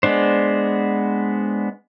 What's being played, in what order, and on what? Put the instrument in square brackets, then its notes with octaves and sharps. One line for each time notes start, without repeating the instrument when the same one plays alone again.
[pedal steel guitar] G#3 B3 D4 C5